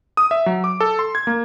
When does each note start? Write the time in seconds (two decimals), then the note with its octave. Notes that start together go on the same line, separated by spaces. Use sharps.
0.17 D#6
0.31 E5
0.46 F#3
0.64 D6
0.80 A4
0.99 C6
1.15 G#6
1.27 A#3